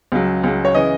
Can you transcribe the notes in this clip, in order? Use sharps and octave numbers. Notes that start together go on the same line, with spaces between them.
C#2 C#3 F#3
C#2 C#3 F#3
C#5
C#3 E3 D#5